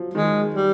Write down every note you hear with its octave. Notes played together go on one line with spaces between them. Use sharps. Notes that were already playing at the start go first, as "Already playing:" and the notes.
Already playing: F3 F#3
D#3 G#3
G3